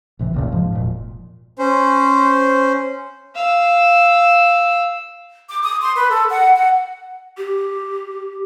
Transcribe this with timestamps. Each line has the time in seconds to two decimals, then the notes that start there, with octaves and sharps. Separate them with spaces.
0.19 A1 C3 E3
0.34 F1 C#2 A#2
0.52 G#2 F3
0.75 E1 A#2
1.58 C#4 C5
3.35 F5 E6
5.48 D6
5.63 D#6
5.81 C6
5.96 B4
6.10 A4
6.29 F#5
6.55 F#5
7.37 G4